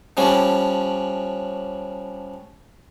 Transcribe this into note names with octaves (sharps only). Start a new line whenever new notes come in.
F3 G3 C#4 D4